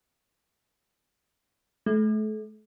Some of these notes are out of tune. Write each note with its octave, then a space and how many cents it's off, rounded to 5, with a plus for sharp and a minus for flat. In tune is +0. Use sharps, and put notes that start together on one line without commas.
A3 -35